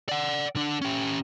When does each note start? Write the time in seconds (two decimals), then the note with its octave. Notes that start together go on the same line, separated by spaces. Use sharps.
0.09 D5 F#5
0.55 D3 D4
0.82 C#4 G4